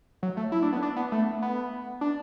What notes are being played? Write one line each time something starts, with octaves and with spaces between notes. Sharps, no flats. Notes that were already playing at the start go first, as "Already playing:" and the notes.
F#3
A3
E4
D4
B3
D4
B3
A3
B3
D4